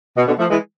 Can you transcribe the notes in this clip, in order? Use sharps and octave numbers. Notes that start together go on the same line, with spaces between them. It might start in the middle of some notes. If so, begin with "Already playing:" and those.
B2
B2 D3
F3 A3
E3 G#3